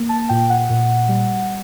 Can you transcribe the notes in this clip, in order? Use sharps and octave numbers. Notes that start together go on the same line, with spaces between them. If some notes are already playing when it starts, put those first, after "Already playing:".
Already playing: A#3
A5
A#2 G5
F#5
A#2
G3